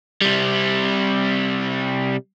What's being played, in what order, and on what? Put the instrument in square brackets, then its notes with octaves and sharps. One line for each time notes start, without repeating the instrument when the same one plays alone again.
[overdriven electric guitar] C3 G3